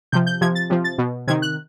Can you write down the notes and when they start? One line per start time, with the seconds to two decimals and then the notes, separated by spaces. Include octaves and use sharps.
0.12 C3 F3 G6
0.27 G6
0.41 C3 F3 G#6
0.55 A6
0.70 C3 F3
0.84 A6
0.98 B2
1.27 C3 D#3 G#6
1.42 F#6